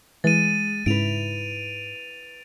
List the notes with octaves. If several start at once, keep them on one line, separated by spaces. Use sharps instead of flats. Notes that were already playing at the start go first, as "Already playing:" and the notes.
E3 G#3 A6 D#7
G#2 C#3 E4 B4 D7 F7